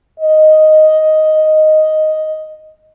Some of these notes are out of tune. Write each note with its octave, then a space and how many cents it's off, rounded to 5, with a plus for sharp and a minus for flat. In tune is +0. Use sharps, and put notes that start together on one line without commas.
D#5 +0